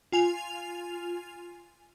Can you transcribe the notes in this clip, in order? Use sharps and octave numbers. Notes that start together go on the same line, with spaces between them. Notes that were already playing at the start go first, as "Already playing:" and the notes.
F4 G#5 F7